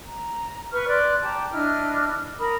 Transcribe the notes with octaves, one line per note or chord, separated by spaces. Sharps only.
A#5
B4 C#6 F6
D5 C6 F#6
G4 A5 A#5
D4 E4 D#5 F6
A#4 B5 D#6